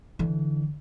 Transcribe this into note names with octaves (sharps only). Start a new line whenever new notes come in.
D3 E3